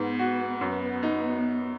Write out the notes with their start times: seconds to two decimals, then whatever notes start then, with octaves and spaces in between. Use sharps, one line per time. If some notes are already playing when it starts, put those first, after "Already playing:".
Already playing: G#2 B3
0.19 F#4
0.61 F#2
1.03 D#4